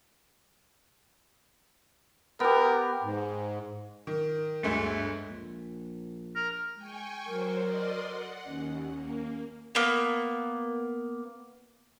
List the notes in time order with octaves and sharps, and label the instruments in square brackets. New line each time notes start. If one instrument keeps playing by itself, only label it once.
[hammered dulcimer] B3 G4 [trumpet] A#4
[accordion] G#2
[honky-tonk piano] D#3
[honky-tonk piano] G1 D2 G#3 [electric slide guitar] A3
[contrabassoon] A#1
[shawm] A#4
[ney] G#3 [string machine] G5 G#5 C#6
[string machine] F#3 C5 [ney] A#4
[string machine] D5 D#5 C6
F#5
[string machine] D#2 [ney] C#4
[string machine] A#3
[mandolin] A#3 B3